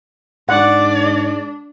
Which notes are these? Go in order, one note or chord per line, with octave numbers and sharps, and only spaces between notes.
G#2 D4 D5 F#5